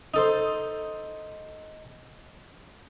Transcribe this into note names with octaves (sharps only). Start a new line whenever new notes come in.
D#4 A4 C5